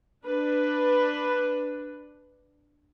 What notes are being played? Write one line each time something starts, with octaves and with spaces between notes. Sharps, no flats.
D4 B4